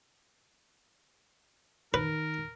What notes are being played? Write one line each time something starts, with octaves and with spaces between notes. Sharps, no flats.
D#3 A#4 B4